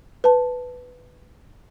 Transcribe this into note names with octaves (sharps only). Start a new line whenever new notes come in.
B4 A5